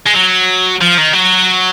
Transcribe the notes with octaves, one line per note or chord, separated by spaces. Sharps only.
G#3
F#3
F3
D#3
F#3